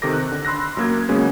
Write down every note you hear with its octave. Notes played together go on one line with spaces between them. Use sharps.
C3 D#3 A4 D6 A#6
F#6
D3
B5 C6 E6 F#6 A#6
F#2 A#3 G#6
C#3 F#3 G#3 A#3 B3 C#4